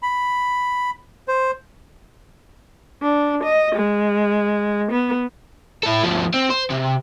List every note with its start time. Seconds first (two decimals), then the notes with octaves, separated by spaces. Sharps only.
0.02 B5
1.28 C5
3.02 D4
3.44 D#5
3.76 G#3
4.92 B3
5.83 E4 A4
6.04 D2 F3
6.34 C4
6.50 C5
6.70 C3